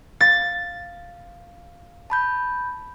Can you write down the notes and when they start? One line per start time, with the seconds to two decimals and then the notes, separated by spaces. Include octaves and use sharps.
0.21 F5 A6
2.10 A5 B5 G6